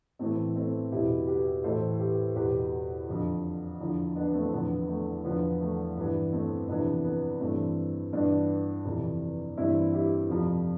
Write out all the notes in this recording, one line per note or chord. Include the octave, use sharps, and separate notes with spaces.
A2 E3 A3 C4
A3 C4
E2 B2 E4 G4
G4 B4
A2 E3 A4 C5
G4 B4
E2 B2 G4 B4
F2 D3 F3
E2 D3 F3
B3 D4
A3 C4
E2 D3 F3 B3
A3
E2 D3 F3 B3
A3
G2 E3 B3
A3 C4
F2 C3 E3 B3 D4
B3
G2 E3 A3 C4
G2 E3 B3 D4
F2 C3 E3
G2 E3 C4 E4
E4 G4
F2 C3 F3